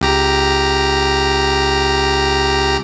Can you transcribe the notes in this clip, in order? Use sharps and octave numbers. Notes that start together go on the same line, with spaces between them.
C#2 G4 A#5